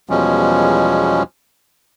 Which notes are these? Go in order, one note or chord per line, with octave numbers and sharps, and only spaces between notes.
E2 B2 F3 G3 G#3 C#4